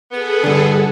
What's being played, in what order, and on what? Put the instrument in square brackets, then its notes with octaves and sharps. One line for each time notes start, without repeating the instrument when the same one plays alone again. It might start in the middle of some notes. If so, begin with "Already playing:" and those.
[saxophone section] B3 [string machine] G#4 A4
[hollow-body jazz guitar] G2 D3